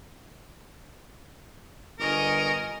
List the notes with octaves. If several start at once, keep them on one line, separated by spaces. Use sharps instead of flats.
G1 A#4 D#5 G#5 C#6